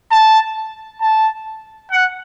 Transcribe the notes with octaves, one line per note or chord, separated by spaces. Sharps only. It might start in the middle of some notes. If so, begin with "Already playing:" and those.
A5
A5
F#5